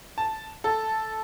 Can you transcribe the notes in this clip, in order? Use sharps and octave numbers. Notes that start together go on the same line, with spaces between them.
A5
A4